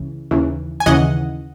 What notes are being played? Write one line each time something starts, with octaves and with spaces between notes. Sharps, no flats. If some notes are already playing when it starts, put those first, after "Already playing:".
Already playing: C#2 C#3 E3
D#2 C#3 E3
G#5
D#2 C#3 E3 D#5 F#5